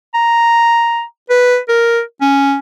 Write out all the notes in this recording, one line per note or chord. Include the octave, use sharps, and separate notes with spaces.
A#5
B4
A#4
C#4